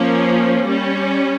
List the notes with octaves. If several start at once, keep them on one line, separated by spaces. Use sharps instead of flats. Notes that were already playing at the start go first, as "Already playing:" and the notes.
Already playing: F3 A#3 C#4
G3 C#4